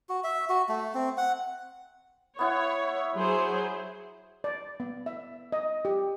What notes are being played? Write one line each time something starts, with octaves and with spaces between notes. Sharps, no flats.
F#4
E5
F#4
A3
C4
F#5
B3 E4 C#5 F#5
F#3 G#4 C5
D5
B3
E5
D#5
G4